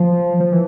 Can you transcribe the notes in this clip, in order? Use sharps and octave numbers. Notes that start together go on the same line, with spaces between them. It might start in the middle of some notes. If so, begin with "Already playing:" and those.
Already playing: F3
F3
E3